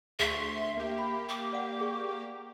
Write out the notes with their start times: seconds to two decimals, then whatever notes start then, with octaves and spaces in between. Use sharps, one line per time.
0.20 D2 G#4 E5 C6 C#6
0.77 A#3 G4
0.99 B5
1.29 D6
1.53 D5 F5 F#5
1.81 G#4 D5 C#6